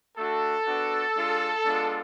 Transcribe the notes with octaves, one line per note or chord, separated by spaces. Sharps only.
A3 D4 F#4 A4
B3 D4 F#4
G#3 D4 F4
G#3 B3 D4 F4